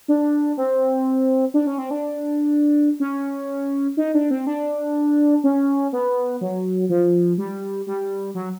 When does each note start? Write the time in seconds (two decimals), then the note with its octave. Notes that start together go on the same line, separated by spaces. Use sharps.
0.08 D4
0.57 C4
1.54 D4
1.67 C#4
1.78 C4
1.91 D4
3.00 C#4
3.97 D#4
4.14 D4
4.31 C4
4.47 D4
5.44 C#4
5.93 B3
6.41 F#3
6.89 F3
7.38 G3
7.87 G3
8.35 F#3